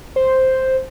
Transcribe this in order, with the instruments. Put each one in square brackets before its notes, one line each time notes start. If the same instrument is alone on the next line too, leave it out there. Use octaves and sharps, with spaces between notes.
[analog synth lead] C5